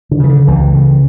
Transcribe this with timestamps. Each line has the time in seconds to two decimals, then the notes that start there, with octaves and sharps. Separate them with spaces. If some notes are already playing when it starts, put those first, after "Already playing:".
0.11 D3
0.20 C#3 E3
0.29 D3
0.47 C#2 E3
0.74 C#3